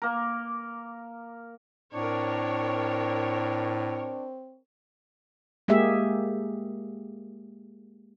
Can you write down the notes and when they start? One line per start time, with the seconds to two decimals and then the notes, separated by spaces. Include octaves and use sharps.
0.02 A#3 A#4
1.94 A2 C4 D4 A#4 C#5
5.68 G#3 A#3 G4 G#4 E5